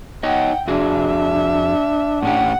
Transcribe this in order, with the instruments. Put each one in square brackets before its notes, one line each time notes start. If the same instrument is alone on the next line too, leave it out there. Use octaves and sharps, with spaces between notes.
[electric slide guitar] D#4 C#5 D#5 [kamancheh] F#5 G5
[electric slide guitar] F2 F#4 G#4 [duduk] D4 [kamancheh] E5
[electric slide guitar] A2 C#4 G4 [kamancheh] F#5